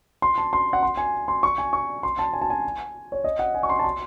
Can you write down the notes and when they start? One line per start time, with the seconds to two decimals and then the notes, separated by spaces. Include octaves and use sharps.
0.22 C6
0.38 A5
0.53 C6
0.73 F#5
0.83 C6
0.97 G#5
1.28 C6
1.43 C#6
1.58 G#5
1.73 C#6
2.03 C6
2.19 A5
2.33 G#5
2.41 A5
2.50 G#5
3.12 C#5
3.24 D#5
3.39 F#5
3.55 G#5
3.63 C#6
3.69 C6
3.79 A5
3.84 C6